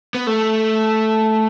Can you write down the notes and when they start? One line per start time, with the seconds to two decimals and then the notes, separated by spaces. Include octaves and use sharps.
0.15 B3
0.27 A3